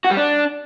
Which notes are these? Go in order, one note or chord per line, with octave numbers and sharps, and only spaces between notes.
F#4
G3
D4